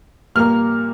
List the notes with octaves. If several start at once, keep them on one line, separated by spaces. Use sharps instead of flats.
A#2 G3 A#3 F6